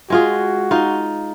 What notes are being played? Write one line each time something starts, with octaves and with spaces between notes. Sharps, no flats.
G#3 F4 F#4 G#4
D#4 F4